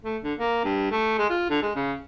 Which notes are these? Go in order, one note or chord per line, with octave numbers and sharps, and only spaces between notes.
A3
D3
A#3
G2
A3
G#3
F4
D3
G#3
C#3